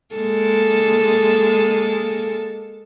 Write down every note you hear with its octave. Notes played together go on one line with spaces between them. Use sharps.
G#3 A#3 A4